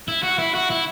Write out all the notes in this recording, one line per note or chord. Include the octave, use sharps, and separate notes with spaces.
E4
F#4
E4
F#4
E4